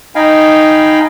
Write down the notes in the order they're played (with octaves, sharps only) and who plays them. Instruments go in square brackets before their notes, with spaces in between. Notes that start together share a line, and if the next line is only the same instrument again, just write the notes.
[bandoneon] D#4 D#5 F5 G5 G#5 B5